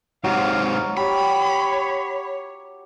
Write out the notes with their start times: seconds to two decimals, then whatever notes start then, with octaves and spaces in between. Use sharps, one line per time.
0.24 G#2 C3 F#3 F5
0.97 G4 C#5 B5